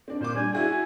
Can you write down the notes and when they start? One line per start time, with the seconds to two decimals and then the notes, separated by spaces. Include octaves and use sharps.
0.08 C4 D4
0.20 A#2 C5 D6
0.35 G3 D4 G#5
0.53 E4 F#4 G#4 G#5